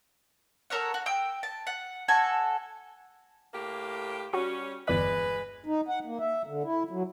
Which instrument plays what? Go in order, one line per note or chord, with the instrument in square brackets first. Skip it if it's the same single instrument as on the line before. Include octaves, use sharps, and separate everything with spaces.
[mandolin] A4 A#4 C#5 F#5
F#4
G5 E6
A5
F#5
F#4 A4 G#5
[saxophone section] A2 A#3 G4
[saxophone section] G3 C#4 [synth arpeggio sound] F#4
[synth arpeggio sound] G1 E2 D5 [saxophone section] G#3 B4
[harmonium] D#4
F#5
A#3
E5
D3
E4
F#3